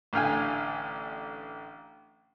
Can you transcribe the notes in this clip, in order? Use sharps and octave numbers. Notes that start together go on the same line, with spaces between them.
A1 D3 F5 G5 G#5